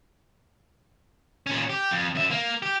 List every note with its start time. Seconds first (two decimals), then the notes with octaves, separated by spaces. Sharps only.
1.46 A#2 C#4
1.70 G4
1.91 F2
2.15 F#2 E5
2.31 A#3
2.62 G4